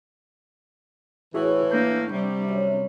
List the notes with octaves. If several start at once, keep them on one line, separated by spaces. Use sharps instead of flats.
A2 E3 E4 F#4 G#4 C#5 E5 F#5
A#3 D4 G6
C3 G3
F#2